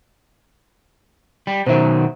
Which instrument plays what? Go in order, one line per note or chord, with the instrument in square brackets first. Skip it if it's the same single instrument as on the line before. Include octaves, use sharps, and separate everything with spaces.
[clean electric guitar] G3
[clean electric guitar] B2 D#3 F#3 [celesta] C5 E5